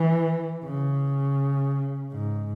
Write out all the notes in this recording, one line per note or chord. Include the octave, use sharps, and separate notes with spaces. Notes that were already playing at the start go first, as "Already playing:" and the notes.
Already playing: E3
C#3
G#2